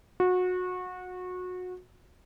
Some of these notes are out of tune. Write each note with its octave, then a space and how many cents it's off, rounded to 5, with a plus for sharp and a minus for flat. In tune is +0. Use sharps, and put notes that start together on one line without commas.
F#4 -25